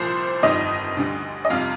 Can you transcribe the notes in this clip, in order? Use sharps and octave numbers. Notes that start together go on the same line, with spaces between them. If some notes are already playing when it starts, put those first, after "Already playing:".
Already playing: C2 A#2 F3 C5
G1 F2 D#3 G3 D#5
D2 D3 G3
D#5
F2 C3 G3 F5